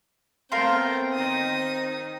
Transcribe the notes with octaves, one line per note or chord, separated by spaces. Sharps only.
A3 B3 C4 A#4 F5 G5 A#5 C6
D#3 D#4 D#6